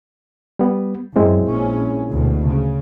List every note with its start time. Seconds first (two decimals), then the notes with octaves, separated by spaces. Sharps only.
0.59 G3 B3
1.16 F#2 G#3 C4 E4
1.47 A#1 C#4
2.10 D2 B2
2.47 C#3